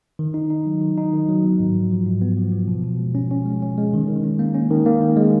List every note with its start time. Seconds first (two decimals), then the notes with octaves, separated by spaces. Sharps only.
0.19 D#3
0.34 D#4
0.50 D#4
0.66 F#3
0.81 D#3
0.98 D#4
1.13 D#3
1.29 F#3
1.44 B3
1.60 G#2
1.75 F3
1.91 F3
2.06 G#2
2.22 B3
2.37 F3
2.52 F3
2.68 B2
2.84 B2
2.99 G#3
3.15 C#4
3.31 C#4
3.46 G#3
3.62 C#4
3.78 G#3
3.93 D#3
4.08 D#3
4.24 C#4
4.39 A#3
4.54 C#4
4.71 D#3
4.86 A#3
5.02 D#3
5.17 G#3